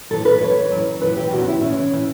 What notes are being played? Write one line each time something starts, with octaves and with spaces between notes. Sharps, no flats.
F#2 E3 A4
B4
F#2 E3 C#5
F#2 E3
F#2 E3 B4
G4
E2 C#3 E3 F#4
E4
E2 C#3 E3 C#4
C#3 E3